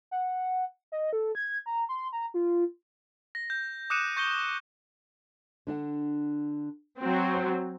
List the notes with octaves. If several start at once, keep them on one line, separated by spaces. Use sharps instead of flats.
F#5
D#5
A4
G#6
A#5
C6
A#5
F4
A#6
G6
D6 D#6 F#6 C#7 D#7 E7
C#6 G6 A#6 C#7 G7
D3 D4 F#5
F#3 C4
C#5 F#5